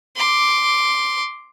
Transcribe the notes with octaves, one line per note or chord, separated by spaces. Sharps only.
C6 D6